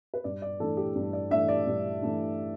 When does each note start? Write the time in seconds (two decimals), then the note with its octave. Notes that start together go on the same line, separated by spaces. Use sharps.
0.14 B4
0.24 G2 D5
0.42 D5
0.60 E3 A3 D4 A4
0.77 G4
0.96 G2
1.13 D5
1.31 E3 A3 D4 E5
1.48 D5
1.66 G2
2.02 E3 A3 D4